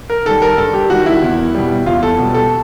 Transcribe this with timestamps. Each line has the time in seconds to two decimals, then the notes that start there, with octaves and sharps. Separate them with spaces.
0.10 A#4
0.25 D#3 G3 A4
0.42 A#4
0.58 G2 A4
0.73 G4
0.90 D#3 G3 F#4
1.06 E4
1.22 E2
1.55 B2 G3
1.86 E2 F4
2.03 A4
2.18 B2 G3
2.34 A4